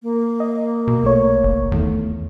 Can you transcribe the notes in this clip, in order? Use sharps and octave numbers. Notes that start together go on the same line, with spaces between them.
A#3
D#5
B2
B1 A3 C#5
F#1
E2 D#3 A3